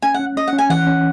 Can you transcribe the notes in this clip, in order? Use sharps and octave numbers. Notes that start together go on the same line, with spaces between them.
C#4 G#5
C#4 F#5
C#4 D#5
F#5
C#4
G#5
E3 F#5
C#4